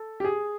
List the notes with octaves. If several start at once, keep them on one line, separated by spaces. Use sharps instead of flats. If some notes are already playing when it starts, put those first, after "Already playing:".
Already playing: A4
G4
G#4